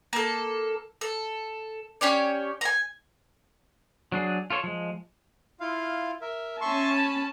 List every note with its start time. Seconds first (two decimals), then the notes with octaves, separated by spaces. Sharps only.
0.13 A#3 A4
1.01 A4
2.01 C#4 G4 C#5 D5
2.61 G#5 A#5
4.12 F#3 D4 G#4
4.50 F4 A4 C#5
4.64 F3 G#3
5.60 E4 F4 F5
6.21 A#4 E5
6.61 C#4 E5 A5 C6 C#6
6.92 B5